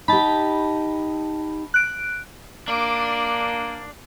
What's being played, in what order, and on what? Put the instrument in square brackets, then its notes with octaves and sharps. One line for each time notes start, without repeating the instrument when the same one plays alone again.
[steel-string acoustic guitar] D#4 G4 [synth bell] A5 B5
[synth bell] F#6 D7
[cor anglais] A#3 [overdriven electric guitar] D4 D5